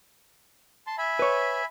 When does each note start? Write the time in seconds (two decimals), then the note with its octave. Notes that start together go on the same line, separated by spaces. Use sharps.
0.87 A5 C6
0.98 E5 G#5 B5
1.19 B4 C#5